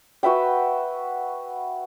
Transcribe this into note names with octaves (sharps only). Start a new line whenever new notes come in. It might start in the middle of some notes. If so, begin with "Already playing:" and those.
F#4 B4 E5 G5